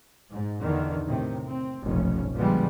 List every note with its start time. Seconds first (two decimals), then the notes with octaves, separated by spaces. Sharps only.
0.31 G#2
0.62 E2 D3 D#3
1.05 A2 C3 D#3
1.47 C4
1.86 F1 B1 G2 A#2 C#4
2.36 A#2 D3 F3 G3 G#3 B3